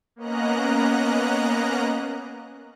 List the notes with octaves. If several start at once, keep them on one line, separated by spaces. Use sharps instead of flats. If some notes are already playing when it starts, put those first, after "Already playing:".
A#3 B3 C#4 D#5 A#5 F#6